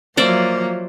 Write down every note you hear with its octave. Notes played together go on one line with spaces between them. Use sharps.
F3 F#3 A#3 C5 D5 E5